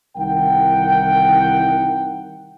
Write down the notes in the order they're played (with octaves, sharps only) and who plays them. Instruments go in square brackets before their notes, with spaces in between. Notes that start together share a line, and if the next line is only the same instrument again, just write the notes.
[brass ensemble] C2 D#3 E3 A#4 F#5 G5